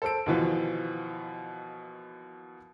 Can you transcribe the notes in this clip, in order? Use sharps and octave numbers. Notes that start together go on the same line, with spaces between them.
A4 C5 E6 D7
D#2 B2 E3 F3